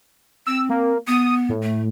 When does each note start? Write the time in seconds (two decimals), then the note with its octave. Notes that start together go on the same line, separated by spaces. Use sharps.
0.47 C4 E6
0.69 A#3
1.07 B3 D#6
1.49 A2
1.63 A3